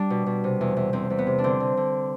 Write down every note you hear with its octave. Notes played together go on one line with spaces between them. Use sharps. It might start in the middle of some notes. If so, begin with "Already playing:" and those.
Already playing: G3 D4
B2
B2
C3
E2
E2
E2 C4
E2
B3
C3
D4
D3 C4
D3
D3